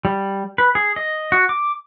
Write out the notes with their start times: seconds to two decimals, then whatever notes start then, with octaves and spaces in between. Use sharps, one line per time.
0.05 G3
0.58 B4
0.75 G#4
0.96 D#5
1.32 F#4
1.49 D6